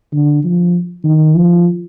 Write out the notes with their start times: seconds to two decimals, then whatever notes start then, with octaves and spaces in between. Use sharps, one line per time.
0.13 D3
0.44 F3
1.04 D#3
1.35 F3